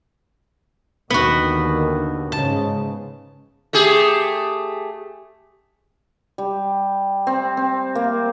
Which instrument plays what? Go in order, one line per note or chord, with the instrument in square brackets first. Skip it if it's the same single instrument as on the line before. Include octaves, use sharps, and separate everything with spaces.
[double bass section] D#2 D3 D#3 [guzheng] B3 F#4
[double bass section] G#2 C#3 [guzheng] A5
[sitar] A3 G4 G#4
[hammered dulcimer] G3
C4
C4
A#3